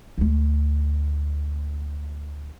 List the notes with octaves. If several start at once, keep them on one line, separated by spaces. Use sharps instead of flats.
D2 A3